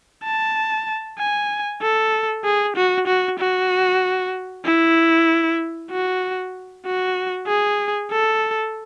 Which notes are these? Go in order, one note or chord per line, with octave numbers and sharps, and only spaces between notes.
A5
G#5
A4
G#4
F#4
F#4
F#4
E4
F#4
F#4
G#4
A4